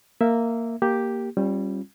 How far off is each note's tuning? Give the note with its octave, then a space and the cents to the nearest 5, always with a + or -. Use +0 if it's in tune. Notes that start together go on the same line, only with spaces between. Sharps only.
A#3 -10 E5 +0
A#3 +0 G4 +0
G3 +0 C#4 -40 F4 +0